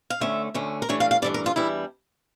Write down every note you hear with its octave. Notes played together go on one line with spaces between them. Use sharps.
F5
D2 D3 A3 C#4 E5
D2 D3 A3 C#4
A#4
G2 E3 A3 D4 C#5
F5
F5
G2 E3 A3 D4 D5
A#4
F4
E2 E3 G3 D4 E4